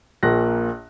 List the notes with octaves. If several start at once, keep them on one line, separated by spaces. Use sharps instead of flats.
A#1 A#2 A#3 F#6 A#6